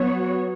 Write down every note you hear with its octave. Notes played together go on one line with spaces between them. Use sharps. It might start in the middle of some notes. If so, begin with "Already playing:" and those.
Already playing: F#3 B3 F#4 C#5